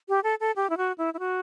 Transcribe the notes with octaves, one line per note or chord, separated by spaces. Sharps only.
G4
A4
A4
G4
E4
F#4
E4
E4
F#4